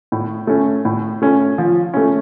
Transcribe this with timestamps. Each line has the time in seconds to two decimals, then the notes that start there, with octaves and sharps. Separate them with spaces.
0.12 A2
0.47 A3 C#4
0.85 A2
1.22 A3 C#4
1.58 F3
1.94 A3 C#4